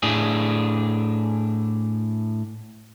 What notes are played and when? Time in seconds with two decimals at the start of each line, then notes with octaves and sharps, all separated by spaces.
0.03 A2 D4 G#4